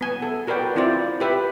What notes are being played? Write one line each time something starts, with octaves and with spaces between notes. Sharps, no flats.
B3 G#5
A4
F#4 A#4 B4 D5 G5
C4 E4 F4 C5 D5
G4 B4 E5